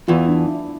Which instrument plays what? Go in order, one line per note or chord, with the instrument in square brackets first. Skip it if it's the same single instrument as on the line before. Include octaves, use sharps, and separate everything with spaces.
[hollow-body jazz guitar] E2 E3 [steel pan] F4
[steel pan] D4
E4